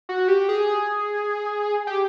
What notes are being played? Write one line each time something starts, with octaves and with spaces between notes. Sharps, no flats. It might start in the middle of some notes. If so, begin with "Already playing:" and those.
F#4
G4
G#4
G4